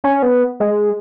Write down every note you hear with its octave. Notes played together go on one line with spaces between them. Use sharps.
C#4
B3
G#3